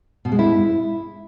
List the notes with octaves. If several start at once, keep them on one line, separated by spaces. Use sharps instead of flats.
B2
G#3
E4